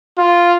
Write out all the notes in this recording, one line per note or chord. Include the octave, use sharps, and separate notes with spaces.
F4